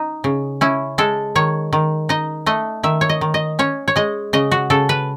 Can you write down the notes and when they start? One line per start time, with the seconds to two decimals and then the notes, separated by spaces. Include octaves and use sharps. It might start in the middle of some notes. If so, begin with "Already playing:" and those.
Already playing: D#4
0.24 C#3
0.61 C#4 E4
0.98 G#3 A4
1.35 D#3 C#5
1.73 D#3
2.09 D#4 D#5
2.46 A3 D#5
2.83 D#3 E5
3.01 C#5
3.09 D#5
3.21 D#3
3.34 D#5
3.59 C#4 C#5
3.88 C#5
3.96 G#3 D#5
4.33 C#3 D#5
4.51 F#4
4.70 C#3 A4
4.89 B4